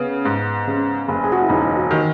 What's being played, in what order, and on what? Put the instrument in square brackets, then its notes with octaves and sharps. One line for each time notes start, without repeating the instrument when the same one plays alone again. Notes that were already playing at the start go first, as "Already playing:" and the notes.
Already playing: [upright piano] C#3 [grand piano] B3
[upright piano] G#2
C#3
F#1
[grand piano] G#4
F#4
E4
[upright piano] E1 [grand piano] D#4
[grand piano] F#4
[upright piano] D#3